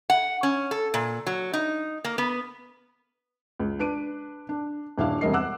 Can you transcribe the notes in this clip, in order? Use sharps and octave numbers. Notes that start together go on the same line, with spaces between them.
F#5
C#4
A4
A#2
F#3
D#4
A#3
B3
C#2
D4 B4 D7 D#7
D4
D#1 D4 E4 F5
E1 C3 G3 A#4 D#5 C7
F#5 D6 E6 F#6